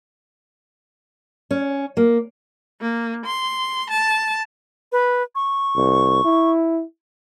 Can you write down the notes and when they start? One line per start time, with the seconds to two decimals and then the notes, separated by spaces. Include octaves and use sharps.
1.51 C#4
1.97 A#3
2.81 A#3
3.26 C6
3.90 A5
4.92 B4
5.35 C#6
5.76 C2
6.25 E4